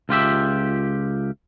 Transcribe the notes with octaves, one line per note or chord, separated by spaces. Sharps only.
C#2 F4 G4 E5